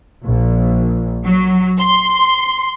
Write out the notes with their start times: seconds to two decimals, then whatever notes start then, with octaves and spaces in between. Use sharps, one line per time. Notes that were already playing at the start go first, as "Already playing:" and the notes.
0.26 A#1
1.24 F#3
1.79 C6